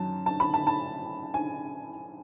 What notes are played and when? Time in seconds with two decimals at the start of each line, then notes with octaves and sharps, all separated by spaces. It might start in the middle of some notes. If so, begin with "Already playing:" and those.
Already playing: F#2 D#3 F#3 C#4 A5
0.26 A5
0.40 B5
0.54 A5
0.67 A5
1.34 G#5